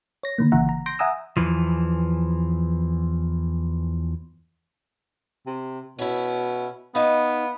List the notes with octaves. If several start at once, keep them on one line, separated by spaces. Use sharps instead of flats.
C#5 A#6
D3 D#3 A#3
G1 C#3 E3 E5 F#5 A#5
A#5
C6 G6 A#6 D7
E5 F#5 G#5 A#5 D#6 E6
E2 E3 F3
C3
B2 C#4 E4
B3 D#4 F5